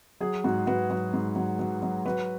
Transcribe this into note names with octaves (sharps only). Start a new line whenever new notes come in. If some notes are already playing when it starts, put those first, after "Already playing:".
F#3 G#4
G#2 F#4
G#2 F#4 B4
F#3 F#4
G#2
F#3
F#3
F#3
F#3 F#4 B4